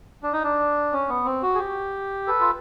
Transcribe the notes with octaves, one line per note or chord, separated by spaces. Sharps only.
D4
D#4
D4
C#4
B3
C4
F#4
G#4
G4
A4 B4
F4